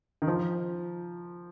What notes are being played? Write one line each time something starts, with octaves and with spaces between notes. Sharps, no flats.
D#3
F3